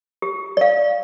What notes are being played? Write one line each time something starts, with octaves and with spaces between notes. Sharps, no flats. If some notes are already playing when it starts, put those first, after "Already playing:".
G4
D5 F5